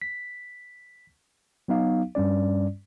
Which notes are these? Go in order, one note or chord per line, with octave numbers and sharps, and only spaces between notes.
B6
F#3 B3 D#4 F5
G2 G3 C#4 D5